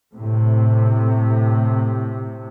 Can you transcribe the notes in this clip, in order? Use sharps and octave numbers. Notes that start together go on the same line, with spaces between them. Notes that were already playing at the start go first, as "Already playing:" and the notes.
A2 C3